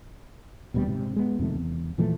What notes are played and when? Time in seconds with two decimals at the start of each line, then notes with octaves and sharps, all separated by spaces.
0.74 D#1 D2 B2 G3
0.87 G#2 C3
1.16 G#3 B3
1.39 F2 C3 D#3 A3
1.55 E2
1.98 A#2 E3 F3 A3